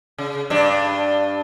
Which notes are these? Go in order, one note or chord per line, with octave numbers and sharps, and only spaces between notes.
C#3
G2 D4